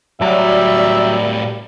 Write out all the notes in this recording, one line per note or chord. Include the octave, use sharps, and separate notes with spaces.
A2 F#3 G3 D5 E5